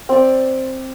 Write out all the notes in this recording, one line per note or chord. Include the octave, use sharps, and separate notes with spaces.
C4 D5